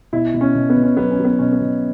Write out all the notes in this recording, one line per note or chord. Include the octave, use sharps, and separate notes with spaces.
B2 E4
B2
C#4
B2
B3
B2
C#4
F#3 B3
C#4
F#3
B3
B2 C#4
B3
B2